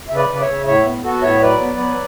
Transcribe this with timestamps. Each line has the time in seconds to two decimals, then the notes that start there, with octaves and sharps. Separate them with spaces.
0.09 C#3 E5
0.16 B4 D5
0.29 C#3
0.35 D5
0.41 C#5 E5
0.48 C#3
0.66 A2 C#5 E5
0.85 B3
1.04 B3 F#4 A4
1.22 A2 C#5 E5
1.41 F#3 B4 D5
1.60 B3
1.79 F#3